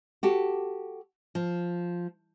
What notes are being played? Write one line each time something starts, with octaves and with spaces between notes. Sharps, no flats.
F#4 G4 A4
F3